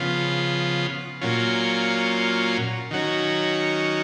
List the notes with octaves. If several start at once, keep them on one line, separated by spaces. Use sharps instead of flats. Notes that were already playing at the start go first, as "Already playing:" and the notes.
Already playing: C#3 F3 B3 F4
A#2 F#3 C#4 F4
D#3 F#3 C#4 F#4